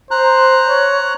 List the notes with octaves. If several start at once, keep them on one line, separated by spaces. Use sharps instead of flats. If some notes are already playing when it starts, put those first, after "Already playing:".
C5 A#5 F#6
C#5